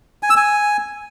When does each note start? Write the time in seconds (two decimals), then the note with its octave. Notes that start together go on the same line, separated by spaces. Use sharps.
0.23 G#5
0.30 E6
0.37 G#5